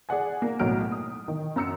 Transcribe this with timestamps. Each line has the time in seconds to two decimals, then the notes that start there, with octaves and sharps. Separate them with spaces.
0.09 G#4 D5 F#5 G#5
0.42 A#3
0.59 B1 A2 F#3 A#3 F6 D7
0.91 D#6
1.28 D#3
1.56 F#2 A#5 E6 C#7